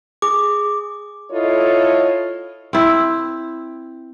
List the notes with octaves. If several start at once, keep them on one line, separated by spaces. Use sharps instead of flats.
G#4 D6
E4 F4 A4 C#5 D#5
C4 E4